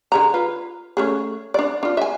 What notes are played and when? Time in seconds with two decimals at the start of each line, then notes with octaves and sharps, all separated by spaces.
0.12 D3 G#4 A#5
0.34 F4 B4
0.97 A3 C#4 G#4
1.54 D4 D5
1.83 D4 F4
1.97 E5 G#5